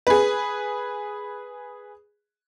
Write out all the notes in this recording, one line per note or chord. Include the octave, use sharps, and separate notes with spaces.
G#4 B4